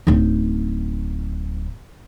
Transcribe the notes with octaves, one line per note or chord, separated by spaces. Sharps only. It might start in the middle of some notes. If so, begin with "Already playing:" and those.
D1 D#4